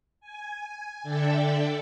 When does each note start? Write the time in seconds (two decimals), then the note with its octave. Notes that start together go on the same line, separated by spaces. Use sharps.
0.20 G#5
1.03 D3 A4 D5 E5 G5 A5